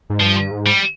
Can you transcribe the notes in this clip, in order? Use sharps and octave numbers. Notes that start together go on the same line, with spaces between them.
G#2
G2 F3
G#2
G3